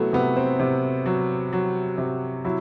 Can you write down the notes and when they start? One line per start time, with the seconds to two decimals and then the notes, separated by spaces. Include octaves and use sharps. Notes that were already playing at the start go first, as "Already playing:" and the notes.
Already playing: C3 F#3 A3 B3 E4
0.13 C3 B3
0.36 C4
0.60 C3
1.06 F#3
1.53 F#3
1.98 C3
2.45 F#3 E4